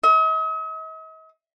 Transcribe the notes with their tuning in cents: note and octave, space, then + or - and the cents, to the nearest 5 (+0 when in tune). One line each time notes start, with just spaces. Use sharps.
D#5 +45